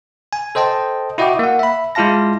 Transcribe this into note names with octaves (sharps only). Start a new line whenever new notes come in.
G#5
A4 C5 D#5 G5 A5
E4 F#4 D#5 E5 G5 D6
A#3 F#5
E5 B5
G#3 E4 F4 F5 A5 A#6